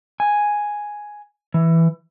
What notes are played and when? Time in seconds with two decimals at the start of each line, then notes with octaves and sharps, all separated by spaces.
0.20 G#5
1.54 E3